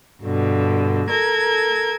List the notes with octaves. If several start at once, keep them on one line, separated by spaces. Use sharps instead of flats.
G2 B2 D3
A4 A#4 G#6